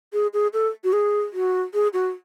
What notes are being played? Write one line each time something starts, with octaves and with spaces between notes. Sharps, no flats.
G#4
G#4
A4
F#4
G#4
F#4
G#4
F#4